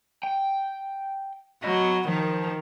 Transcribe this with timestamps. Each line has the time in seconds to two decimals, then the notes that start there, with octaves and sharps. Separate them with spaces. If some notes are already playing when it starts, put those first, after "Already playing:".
0.23 G5
1.64 F#3 D#5 B5
2.08 D#3 F3